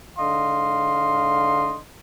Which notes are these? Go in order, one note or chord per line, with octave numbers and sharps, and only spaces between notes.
G#2 D3 D#5 F5 C6